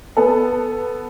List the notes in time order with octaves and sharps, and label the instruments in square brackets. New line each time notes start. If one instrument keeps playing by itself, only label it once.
[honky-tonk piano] B3 A4